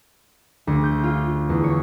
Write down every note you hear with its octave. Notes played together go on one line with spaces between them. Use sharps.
D2
G6
F4
E2
C#5